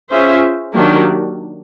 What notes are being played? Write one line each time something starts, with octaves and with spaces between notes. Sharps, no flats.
C#4 F4 G#4 C5 E5
D#3 F#3 A#3 D4 G4